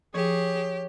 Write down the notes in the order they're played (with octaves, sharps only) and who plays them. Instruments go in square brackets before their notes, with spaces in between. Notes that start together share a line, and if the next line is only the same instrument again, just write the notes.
[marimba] F3 [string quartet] G4 [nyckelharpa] G#4 [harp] C#5